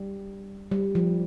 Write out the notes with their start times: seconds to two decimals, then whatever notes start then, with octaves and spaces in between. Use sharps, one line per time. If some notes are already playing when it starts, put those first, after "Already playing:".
Already playing: G3
0.71 G3
0.95 F3